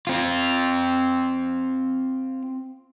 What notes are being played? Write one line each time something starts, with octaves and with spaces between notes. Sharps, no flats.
C4 F4